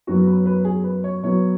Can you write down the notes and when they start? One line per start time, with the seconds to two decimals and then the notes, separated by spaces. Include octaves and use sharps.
0.07 F#2 F#3 B3 F#4
0.27 B4
0.46 B4
0.65 G#4
0.84 B4
1.04 C#5
1.22 B2 F#3 B3 C#5